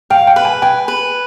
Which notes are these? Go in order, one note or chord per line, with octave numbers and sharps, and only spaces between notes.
F5 G5
G5
B4
G#5
G5 G#5
B4